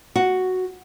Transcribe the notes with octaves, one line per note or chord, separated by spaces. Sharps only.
F#4